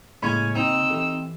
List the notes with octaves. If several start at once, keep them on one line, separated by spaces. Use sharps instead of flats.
A2 C#3 G#3 A#3 C#4 G#5 B5
C4 D#4 E6
E3 G4 A4